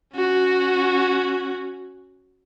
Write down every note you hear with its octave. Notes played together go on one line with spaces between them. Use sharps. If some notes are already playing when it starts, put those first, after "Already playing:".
C#4 F#4